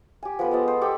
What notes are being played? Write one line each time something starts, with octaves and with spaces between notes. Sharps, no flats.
G4 G#5
F3 B3 A4 B4
G#3 B3 D#5 A5
C5
G4 A4 D5 G5